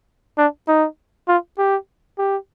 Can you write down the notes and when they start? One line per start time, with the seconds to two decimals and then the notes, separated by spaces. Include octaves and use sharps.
0.38 D4
0.68 D#4
1.28 F4
1.58 G4
2.18 G4